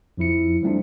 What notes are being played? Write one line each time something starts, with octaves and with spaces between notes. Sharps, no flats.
F2 F3 E4 C#7
F3 G3 A3 C4 D4 D#4